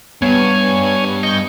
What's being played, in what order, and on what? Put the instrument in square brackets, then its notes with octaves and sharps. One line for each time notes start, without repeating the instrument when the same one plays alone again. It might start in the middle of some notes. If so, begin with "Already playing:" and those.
[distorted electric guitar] G2 [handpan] B3 [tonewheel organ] C#5 G#5
[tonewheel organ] D#5 C#6 G6